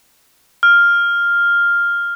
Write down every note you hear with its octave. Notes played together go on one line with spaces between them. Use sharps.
F6